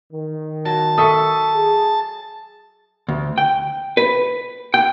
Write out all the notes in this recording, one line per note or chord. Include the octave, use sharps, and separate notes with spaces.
D#3
F#3 A5
A4 E5 C#6 D#6
G#4
D2
G5
B4
G5